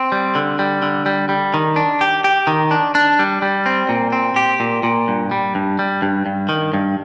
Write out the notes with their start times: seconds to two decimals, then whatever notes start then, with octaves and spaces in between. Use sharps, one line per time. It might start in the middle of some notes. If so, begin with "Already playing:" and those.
Already playing: C4
0.12 G3
0.35 D3
0.59 G3
0.82 D3
1.06 G3
1.29 G3
1.54 D#3
1.76 D4
2.01 G4
2.24 G4
2.47 D#3
2.71 D4
2.95 D4
3.19 G3
3.42 G3
3.66 C4
3.89 A#2
4.12 C4
4.36 G4
4.60 A#2
4.83 A#2
5.08 G2
5.31 G3
5.55 G2
5.79 G3
6.02 G2
6.26 G2
6.49 D#3
6.73 G2